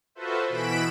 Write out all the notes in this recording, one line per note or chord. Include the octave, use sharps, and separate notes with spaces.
F4 F#4 A4 B4 C5 E5
B2 E3 B5 B6 D7 E7